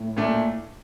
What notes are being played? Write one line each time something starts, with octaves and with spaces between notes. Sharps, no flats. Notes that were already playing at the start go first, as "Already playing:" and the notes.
Already playing: A2
A#2 A3 D4